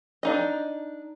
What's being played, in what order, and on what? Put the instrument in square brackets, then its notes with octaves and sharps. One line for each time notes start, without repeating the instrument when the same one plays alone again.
[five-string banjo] D4 D#4 D#5